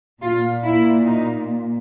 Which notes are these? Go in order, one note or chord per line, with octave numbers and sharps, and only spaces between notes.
A#2 F4
E4
D#4